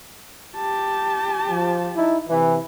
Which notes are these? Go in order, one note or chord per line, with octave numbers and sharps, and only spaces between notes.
G4 A5
F3
D#4 E4
C3 E3